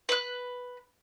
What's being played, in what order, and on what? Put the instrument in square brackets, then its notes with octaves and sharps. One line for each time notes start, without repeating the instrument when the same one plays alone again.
[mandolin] B4 F#6